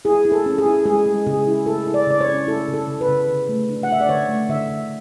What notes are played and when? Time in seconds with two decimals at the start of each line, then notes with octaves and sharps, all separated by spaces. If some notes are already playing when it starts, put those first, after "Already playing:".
0.05 E4 G#4
0.25 E4
0.32 A4
0.46 C#4
0.58 G#4
0.66 E4
0.85 G#3 G#4
1.06 G#3
1.27 C#3 G#4
1.47 E4
1.66 E4 A4
1.87 E4
1.94 D5
2.07 C#3 D5
2.21 C#5
2.28 C#4
2.47 E4 A4
2.68 C#3
2.74 A4
2.88 C#3
3.01 B4
3.09 C#3
3.28 D3
3.49 A3
3.69 D4
3.83 F#5
3.89 D4 E5
4.01 D5
4.09 D3 C#5
4.29 A3
4.49 D3 E5
4.70 D3